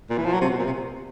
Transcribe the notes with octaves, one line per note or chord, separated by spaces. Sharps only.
A#2
E3
F3
F#3
C3
B2
A#2
C3